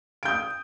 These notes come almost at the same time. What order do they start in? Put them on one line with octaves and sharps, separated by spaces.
D7 G6 D#6